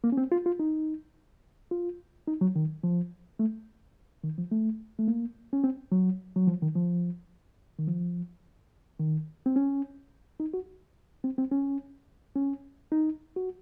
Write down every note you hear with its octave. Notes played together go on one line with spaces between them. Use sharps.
A#3
C#4
C4
F4
F4
D#4
F4
D#4
F#3
D#3
F3
A3
D#3
F3
A3
A3
A#3
C#4
C4
F#3
F#3
F3
D#3
F3
D#3
F3
D#3
C4
C#4
D#4
F#4
C4
C4
C#4
C#4
D#4
F#4